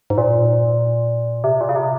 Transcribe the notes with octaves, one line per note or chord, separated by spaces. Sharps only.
G#2
A#2
C3
A#2
C#3
C3